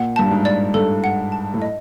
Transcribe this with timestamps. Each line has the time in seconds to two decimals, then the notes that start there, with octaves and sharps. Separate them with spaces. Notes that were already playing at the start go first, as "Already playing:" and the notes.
Already playing: A#2 F#5
0.16 G2 A5
0.31 G#2
0.45 D5
0.74 G2 A4
1.04 F#5
1.32 A5
1.54 A2
1.62 D#5